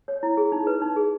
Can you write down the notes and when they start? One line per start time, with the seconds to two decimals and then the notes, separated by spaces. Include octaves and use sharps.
0.08 C#5
0.23 E4
0.37 G#4
0.52 D#4
0.67 B4
0.82 D#4
0.96 G#4